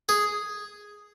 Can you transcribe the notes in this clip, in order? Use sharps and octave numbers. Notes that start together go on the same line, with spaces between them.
G#4